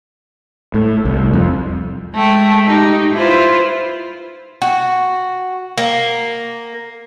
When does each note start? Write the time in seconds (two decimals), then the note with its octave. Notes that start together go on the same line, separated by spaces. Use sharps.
0.74 A2
1.05 C2
1.33 F2
2.14 G#3 A3 G5
2.65 D#4 G4
3.14 E4 F4 B4 C5
4.62 F#4
5.78 A#3